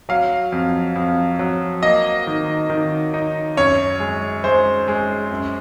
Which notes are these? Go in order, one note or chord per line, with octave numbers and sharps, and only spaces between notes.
F#3 F5
F2
F2
F#3
A#3 D#5
D#3
D#3
D#4
F#2 C#5
G#3
G#3 C5
G#3
F#2